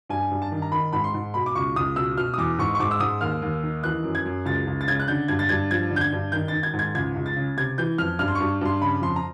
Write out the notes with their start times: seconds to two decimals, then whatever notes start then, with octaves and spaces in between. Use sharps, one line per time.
0.09 G2 G#5
0.31 G2
0.42 A5
0.52 D#3
0.62 A#5
0.72 D#3 B5
0.93 G#2 B5
1.04 C6
1.14 G#2
1.34 B2 B5
1.46 D6
1.55 C#2 C#6
1.76 C#2 D#6
1.96 B2 E6
2.17 B2 F6
2.34 D#6
2.38 E2 D6
2.59 G#2 C#6
2.75 C#6
2.80 G#2 D6
2.91 E6
3.00 G#2 D#6
3.21 D#2 F6
3.42 D#2
3.63 D#3
3.84 E3 F#6
4.04 F#2
4.15 G#6
4.26 F#2
4.45 C#2 A6
4.67 C#2
4.81 A6
4.88 C#3 G#6
5.00 F#6
5.08 D3 G6
5.28 G2 G#6
5.39 A6
5.49 G2 G#6
5.71 F3 G#6
5.91 D3
5.96 G6
6.01 G#6
6.12 G2
6.32 D#3 G6
6.48 D#3 A6
6.63 G#6
6.74 G#2
6.79 G#6
6.95 C#2 G#6
7.16 C#2
7.26 A6
7.36 C#3
7.57 C3 G#6
7.78 E3 G6
7.98 F2 F6
8.19 G2 F6
8.28 C6
8.35 G2 C#6
8.61 G2 C6
8.81 C#3 B5
9.02 F2 C6
9.16 A#5